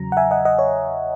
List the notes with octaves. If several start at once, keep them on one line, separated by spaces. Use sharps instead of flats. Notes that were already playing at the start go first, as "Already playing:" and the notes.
Already playing: E2 C#3 F#3 A#5
F#5
E5 G#5
D#5 F#5
D#5 F#5
C#5